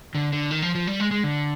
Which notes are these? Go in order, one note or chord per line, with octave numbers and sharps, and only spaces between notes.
D3
D3
D#3
F3
F3
G3
G#3
G#3
D3